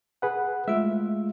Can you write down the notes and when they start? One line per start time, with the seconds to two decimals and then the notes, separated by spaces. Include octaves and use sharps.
0.22 G#4 B4 F#5
0.68 G#3 A3 F4 E5